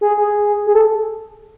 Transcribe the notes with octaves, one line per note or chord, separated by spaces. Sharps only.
G#4
G#4
G#4
A4